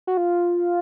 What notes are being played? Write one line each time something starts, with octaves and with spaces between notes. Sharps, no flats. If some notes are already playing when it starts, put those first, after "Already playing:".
F#4
F4